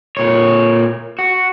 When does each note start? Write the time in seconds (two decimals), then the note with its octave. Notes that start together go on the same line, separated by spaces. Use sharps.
0.17 A#2 C#5
1.19 F#4